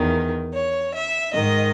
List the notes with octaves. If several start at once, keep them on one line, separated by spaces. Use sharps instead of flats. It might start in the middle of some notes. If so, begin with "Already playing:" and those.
Already playing: E2 D#3
C#5
E5
G#2 D#3 D#5